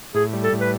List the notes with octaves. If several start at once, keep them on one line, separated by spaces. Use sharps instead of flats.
A2 G#4
G3
A4
A2
B4